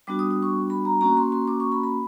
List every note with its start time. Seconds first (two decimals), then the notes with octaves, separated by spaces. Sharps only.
0.07 G3 B3 D4 F#4 D6
0.19 D#6
0.31 D#6
0.43 C#6
0.70 B5
0.85 A#5
1.01 A#3 C#4 F#4 A#5
1.17 C6
1.32 C6
1.48 D6
1.60 C#6
1.72 B5
1.83 B5